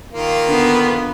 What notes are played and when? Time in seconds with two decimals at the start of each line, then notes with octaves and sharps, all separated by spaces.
0.13 D#3 A#3 F4
0.48 D3 B3